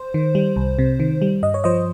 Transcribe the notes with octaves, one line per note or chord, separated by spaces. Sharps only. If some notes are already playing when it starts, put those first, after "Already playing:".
Already playing: C5
D#3
G3
C2
C3
D#3
G3
G2 D#5
C#5
F3 C5 D#5